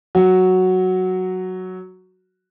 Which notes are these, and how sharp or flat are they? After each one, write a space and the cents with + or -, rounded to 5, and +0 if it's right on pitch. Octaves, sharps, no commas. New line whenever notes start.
F#3 +0 F#4 +0